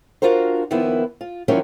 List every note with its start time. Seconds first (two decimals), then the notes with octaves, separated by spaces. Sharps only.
0.22 D4 F4 F#4 A#4 C5
0.71 D#3 F3 A#3 B3 E4
1.21 F4
1.48 D#3 F3 F#3 A#3 C#4 E4